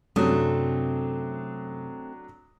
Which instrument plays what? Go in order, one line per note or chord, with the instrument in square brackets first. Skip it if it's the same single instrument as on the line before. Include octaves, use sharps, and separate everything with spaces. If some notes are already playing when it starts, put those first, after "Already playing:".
[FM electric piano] F#2 C3 [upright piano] F#3 D4 D#6 [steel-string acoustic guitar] A3 C4